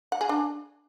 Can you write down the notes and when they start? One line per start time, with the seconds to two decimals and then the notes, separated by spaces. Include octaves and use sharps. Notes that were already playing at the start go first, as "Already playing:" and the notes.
0.12 F#5
0.21 G#4
0.29 D4